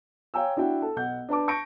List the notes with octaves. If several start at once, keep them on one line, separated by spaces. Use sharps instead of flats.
C#5 F5 G5 G#5 A#5 E6
D4 E4 F#4 G5
A4
B1 B2 F#5 G6
D4 B4 A5 D6
A5 C#6 G6 A#6 D7